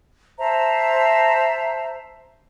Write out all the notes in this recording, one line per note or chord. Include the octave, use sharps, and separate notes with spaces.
C5 E5 A5 A#5